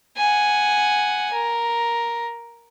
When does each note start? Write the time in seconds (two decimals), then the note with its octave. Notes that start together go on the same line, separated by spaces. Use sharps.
0.17 F#5 G#5
1.33 A#4